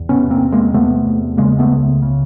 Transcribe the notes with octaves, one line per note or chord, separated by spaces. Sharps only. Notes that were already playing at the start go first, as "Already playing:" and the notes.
Already playing: E2
C3 B3 C#4
A#3 C4
E2
G#3 A#3
C3 A3 B3
E2
C#3 G#3 A#3
A3 B3
C#2
C#3